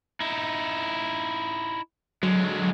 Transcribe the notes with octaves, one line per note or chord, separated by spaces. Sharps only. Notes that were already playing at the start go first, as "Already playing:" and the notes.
D#4 E4
D3 F#3 G#3